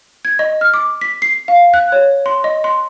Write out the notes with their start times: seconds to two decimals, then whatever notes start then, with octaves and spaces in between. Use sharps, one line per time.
0.25 G#6
0.39 D#5
0.61 F6
0.74 D6
1.01 B6
1.22 C7
1.48 F5
1.74 F#6
1.92 C#5
2.26 C6
2.44 D#5
2.64 C6